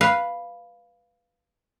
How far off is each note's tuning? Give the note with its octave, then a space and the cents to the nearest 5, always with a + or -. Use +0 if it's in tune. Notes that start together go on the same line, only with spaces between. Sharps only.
B4 -5 F5 +0